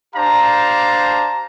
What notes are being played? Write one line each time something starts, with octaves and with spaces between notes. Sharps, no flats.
D4 G4 C5 F5 A5 A#5